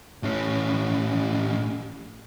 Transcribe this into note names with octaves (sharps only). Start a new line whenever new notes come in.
A2 C#4